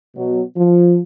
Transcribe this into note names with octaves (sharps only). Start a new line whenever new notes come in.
B2 F#3
F3